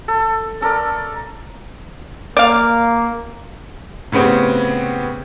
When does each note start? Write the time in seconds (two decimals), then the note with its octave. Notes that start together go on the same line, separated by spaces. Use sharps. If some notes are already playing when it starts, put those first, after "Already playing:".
0.08 A4
0.61 C#4 A4 A#4 D5
2.37 A#3 D5 F5
4.12 A2 C#3 B3 C4 G4